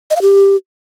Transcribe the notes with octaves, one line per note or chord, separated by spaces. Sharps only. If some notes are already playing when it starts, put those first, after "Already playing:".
D#5
F5
G4